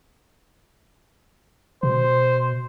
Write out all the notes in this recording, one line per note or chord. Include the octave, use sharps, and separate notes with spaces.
B2 C5